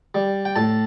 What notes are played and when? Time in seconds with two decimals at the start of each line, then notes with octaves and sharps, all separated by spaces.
0.15 G3
0.45 G5
0.56 A2 A5